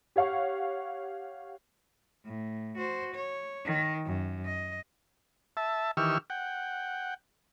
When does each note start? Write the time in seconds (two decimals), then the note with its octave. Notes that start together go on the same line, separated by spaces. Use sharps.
0.16 G4 C#5 F5 F#5 C#6
2.25 A2
2.78 F#4 C5
3.15 C#5
3.65 D#3
4.06 F#2
4.45 D#5
5.57 E5 A5
5.97 D#3 E3 G4 C#6 E6 F6
6.30 F#5 G5